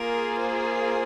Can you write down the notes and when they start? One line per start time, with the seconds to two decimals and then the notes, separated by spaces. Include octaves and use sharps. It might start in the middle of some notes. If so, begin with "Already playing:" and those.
Already playing: A#3 F4 G#4 A#4
0.39 C5